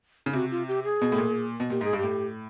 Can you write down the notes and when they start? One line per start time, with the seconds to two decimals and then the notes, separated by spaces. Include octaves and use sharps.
0.26 C#3
0.33 C3 F#4
0.51 F4
0.68 G4
0.84 G#4
1.02 B2
1.12 A2
1.18 A#2
1.60 B2
1.70 A#2 G4
1.81 G#2
1.84 G#4
1.93 G2
1.98 G4
2.03 A2